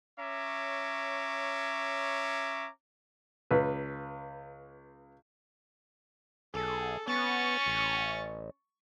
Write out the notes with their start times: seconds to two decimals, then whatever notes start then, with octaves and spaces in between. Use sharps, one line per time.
0.19 C#4 C#5 E5 A#5 D6
3.51 C#2 B4
6.54 B1 G#4 A4
7.08 B3 C#4 C#6 A6
7.66 A1